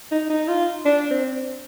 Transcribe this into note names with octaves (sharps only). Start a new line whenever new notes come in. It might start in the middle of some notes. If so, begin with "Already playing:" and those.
D#4
D#4
F4
D4
C4